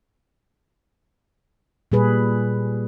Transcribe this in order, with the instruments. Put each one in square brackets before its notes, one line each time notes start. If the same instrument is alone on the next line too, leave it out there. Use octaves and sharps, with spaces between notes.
[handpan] A#2 G3 G#4 B4